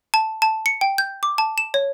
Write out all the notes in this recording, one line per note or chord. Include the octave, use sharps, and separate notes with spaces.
A5
A5
C#7
G5
G6
D6
A5
E7
C#5